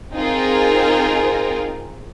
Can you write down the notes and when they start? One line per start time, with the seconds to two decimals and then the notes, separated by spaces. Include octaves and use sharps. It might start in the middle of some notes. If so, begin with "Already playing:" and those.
0.13 C4 D#4 F4 G#4 A#4